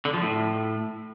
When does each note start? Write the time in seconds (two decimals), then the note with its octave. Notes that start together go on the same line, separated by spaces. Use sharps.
0.05 D3
0.13 F3
0.22 A2